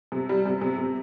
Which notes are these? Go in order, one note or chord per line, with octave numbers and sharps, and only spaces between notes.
C3
G3
C3
C3
C3